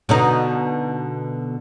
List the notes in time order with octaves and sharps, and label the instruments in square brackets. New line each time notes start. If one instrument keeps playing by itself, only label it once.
[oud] B2 D3 D#4